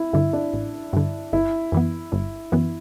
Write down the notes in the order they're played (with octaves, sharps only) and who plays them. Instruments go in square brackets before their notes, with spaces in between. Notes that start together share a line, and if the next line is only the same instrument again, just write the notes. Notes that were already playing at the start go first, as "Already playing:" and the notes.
Already playing: [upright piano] E4
[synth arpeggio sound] G2 D3 [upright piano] E4
[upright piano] D4
[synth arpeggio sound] A1
G2 D3
[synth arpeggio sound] G1 [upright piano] E4
[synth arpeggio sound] F#2 E3 B3
G1
F#2 E3 B3